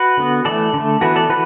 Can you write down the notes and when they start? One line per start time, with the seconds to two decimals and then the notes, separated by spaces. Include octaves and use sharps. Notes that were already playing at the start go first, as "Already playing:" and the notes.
Already playing: F#4 B4
0.17 D3 B3
0.45 E3 A3 A4 D5
0.74 D3 A3
1.01 E3 B3 F#4 B4
1.16 A4 D5
1.29 E3 F#4 B4